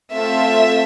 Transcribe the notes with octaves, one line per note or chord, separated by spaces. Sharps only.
A3 C4 F4 A4 E5